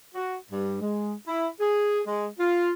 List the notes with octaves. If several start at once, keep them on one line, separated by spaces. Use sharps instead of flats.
F#4
G2
G#3
E4
G#4
G#3
F4